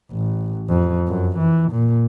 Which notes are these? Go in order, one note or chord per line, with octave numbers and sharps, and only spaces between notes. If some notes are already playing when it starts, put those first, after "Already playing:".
A1
F2
F#2
E3
A#2